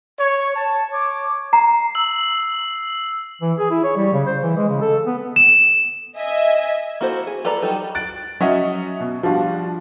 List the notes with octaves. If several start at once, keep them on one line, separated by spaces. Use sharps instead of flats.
C#5
A5
C#5 D6
A#5 C7
E6 F#7
E3
G#4
E4
C#5
G3
C#3
C5
E3
G#3
C#3
A4
B3
E7
D#5 E5 G#5
A#3 E4 F#4 A4 C5
G#4
F4 A4 B4 D5 A#5
D#3 F#3 G3 D#4 A4
F#6 A6 D7
F#3 C#4 F#4 D#5 E5 F#5
B2
F3 G3 D4 F4 F#4